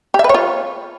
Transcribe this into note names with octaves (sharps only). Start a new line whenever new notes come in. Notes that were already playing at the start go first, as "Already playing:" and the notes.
G4
E5
B4
C#5
F4